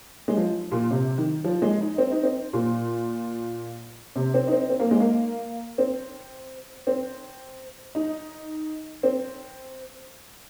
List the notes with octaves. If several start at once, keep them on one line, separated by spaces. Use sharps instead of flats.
G#3
F3
A#2
C3
D#3
F3
G#3
D#4
C4
D#4
C4
A#2
C3
C4
D#4
C4
C4
A#3
G#3
A#3
C4
C4
D#4
C4